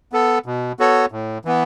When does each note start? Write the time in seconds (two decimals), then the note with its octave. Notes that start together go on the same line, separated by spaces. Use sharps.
0.12 B3 A4
0.46 B2
0.79 B3 F#4 A4 C#5
1.12 A2
1.45 E3 B3